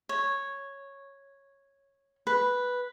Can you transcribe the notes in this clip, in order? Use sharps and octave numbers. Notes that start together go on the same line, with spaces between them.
C#5
B4